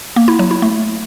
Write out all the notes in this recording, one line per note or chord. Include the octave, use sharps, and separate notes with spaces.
A#3
E4
F#3
E4
A3